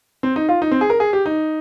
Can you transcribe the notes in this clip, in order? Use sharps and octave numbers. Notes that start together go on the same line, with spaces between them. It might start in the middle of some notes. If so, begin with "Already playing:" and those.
C4
D#4
F4
D#4
C4
G#4
A#4
G#4
G4
D#4